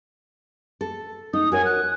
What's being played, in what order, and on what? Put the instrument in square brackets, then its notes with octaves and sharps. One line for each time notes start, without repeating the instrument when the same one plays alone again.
[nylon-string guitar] A4
[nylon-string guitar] D#4 [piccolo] D#6
[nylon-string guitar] F#4 A#4 C#5 [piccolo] G#5
[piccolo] F#6